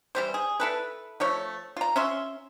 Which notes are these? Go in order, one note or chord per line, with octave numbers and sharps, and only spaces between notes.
E3 G3 C5
G#4
E4 A4 B4
F3 A3 C#5
F4 A#5
C#4 E5 C6